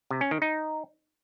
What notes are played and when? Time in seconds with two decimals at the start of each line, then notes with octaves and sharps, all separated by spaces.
0.11 C3
0.21 C#4
0.31 D#3
0.42 D#4